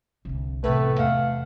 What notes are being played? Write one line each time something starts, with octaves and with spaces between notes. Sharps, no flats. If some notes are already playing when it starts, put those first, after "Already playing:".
C2 D3
A2 C3 E3 A3 B3 B4
E2 A3 F5 F#5